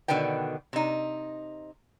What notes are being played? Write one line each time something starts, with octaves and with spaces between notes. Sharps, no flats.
B2 D3 D#3 B4 G5
C3 D#4